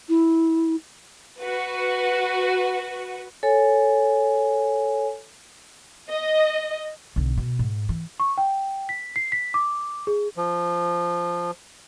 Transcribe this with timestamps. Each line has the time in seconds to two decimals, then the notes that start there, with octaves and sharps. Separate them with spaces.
0.09 E4
1.39 F#4 B4
3.43 A4 C#5 G#5
6.09 D#5
7.16 B1 D3
7.38 B2
7.59 G#2
7.89 E3
8.20 C#6
8.38 G5
8.89 B6
9.16 C7
9.32 B6
9.54 D6
10.07 G#4
10.37 F3